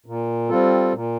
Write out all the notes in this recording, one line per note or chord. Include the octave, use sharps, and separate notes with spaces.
A#2
G3 C4 F4 A4
A#2